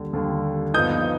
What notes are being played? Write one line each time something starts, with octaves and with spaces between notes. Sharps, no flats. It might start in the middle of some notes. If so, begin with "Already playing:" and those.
Already playing: D#2 D3 G3
D#2 D3 G3
G2 F3 B3 D#4 D#6 G6